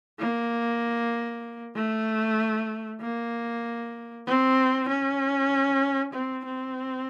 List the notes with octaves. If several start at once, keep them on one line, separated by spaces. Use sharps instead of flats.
A#3
A3
A#3
C4
C#4
C4
C4